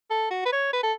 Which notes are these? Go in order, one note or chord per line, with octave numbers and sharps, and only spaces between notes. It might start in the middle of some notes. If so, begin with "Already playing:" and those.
A4
F#4
B4
C#5
B4
A4